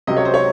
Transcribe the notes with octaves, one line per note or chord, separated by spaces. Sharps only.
C#2 C3 F#3 D#5
C#5
C5
C#5